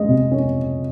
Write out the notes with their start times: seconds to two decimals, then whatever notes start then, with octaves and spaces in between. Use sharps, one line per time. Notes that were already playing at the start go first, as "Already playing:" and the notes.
Already playing: G#3 C#4 D#5
0.09 C3
0.32 C#4